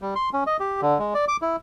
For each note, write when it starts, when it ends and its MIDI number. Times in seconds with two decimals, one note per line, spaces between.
0.02 0.14 55
0.16 0.29 84
0.33 0.44 61
0.47 0.57 75
0.60 0.81 67
0.81 0.98 50
0.99 1.14 56
1.14 1.25 74
1.28 1.37 86
1.42 1.56 64